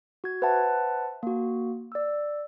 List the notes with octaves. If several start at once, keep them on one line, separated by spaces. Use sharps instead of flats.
F#4 G#6
B4 C5 E5 F#5 A5
A#3 F#4
D5 E6